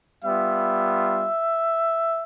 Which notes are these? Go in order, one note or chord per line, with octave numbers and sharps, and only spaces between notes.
G3 B3 F4 E5